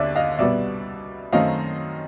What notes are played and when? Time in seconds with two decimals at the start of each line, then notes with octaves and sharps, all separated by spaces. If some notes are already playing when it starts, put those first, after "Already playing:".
Already playing: D#2 D3 D5 E5
0.16 D#5 F5
0.39 C2 B2 G3 B3 D5 E5
1.32 F#2 D#3 F#3 A3 C4 D#5 F5